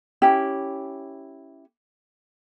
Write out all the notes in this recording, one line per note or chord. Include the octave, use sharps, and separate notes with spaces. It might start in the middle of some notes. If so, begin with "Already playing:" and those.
C#4 E4 G4